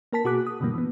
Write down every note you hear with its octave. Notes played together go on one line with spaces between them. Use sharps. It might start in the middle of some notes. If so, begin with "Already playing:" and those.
A#3 A#4 A5 B6
B2 F#4 G#4 D6 F#6
D#6
G2 B2 D3 E3 G3 A#3
E3 B3